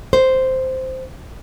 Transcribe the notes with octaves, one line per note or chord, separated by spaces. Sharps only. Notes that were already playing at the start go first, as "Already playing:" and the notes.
C5